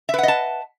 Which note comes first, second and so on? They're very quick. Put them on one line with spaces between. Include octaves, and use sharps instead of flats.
E5 B4 F#5 D#5 A5